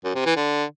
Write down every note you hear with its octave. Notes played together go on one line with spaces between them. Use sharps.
F#2
C3
E3
D3